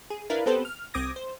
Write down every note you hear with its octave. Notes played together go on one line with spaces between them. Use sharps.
G#4
D4 E4 A#4 B4 F5
B3 C4 G4 A4 B4 C5
F6
C2 C4 D6 D#6 G#6 A#6
C5